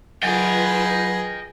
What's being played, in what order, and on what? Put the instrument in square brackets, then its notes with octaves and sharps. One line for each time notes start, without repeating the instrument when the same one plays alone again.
[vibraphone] F#3 [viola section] F4 B4 [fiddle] G#4 [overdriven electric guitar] D#5 G5